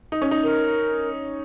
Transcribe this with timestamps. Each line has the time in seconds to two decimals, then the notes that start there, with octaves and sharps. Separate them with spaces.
0.12 D#4
0.22 C#4
0.31 D#4
0.43 A#4